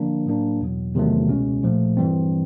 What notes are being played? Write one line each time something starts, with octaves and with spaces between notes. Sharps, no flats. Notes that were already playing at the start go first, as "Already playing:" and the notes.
Already playing: D3 F3 A#3 D4
A2 F#3 A#3 D4
E2 B2 F#3
E2 C3 D#3 F#3 A3
C#2 B2 G#3 C#4
A#2 F3 A3
G2 E3 G3 C4